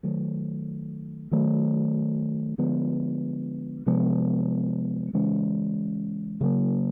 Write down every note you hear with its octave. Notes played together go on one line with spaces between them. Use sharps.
D#3 F#3 A3
D#3 F#3 A3
D3 F3 G#3 B3
C3 F3 G#3 B3
C#3 E3 G#3 C#4
C#3 F#3 A#3